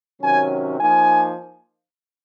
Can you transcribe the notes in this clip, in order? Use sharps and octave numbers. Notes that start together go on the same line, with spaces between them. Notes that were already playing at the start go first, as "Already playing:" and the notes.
C3 D#3 F#3 C#4 G#5
F3 A#3 D#4 G#5